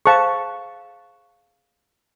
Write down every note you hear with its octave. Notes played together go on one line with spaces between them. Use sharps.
G#4 C5 F5 A5 C#6